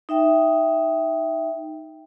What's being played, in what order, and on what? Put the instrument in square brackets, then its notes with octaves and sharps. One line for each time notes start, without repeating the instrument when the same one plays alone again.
[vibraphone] D#4 E5 G5